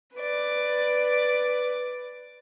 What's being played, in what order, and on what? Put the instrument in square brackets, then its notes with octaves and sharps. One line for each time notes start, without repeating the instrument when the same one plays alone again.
[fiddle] B4 D5